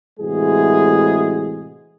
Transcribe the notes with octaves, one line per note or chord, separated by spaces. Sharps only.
A2 C3 E3 G#3 F#4 G#4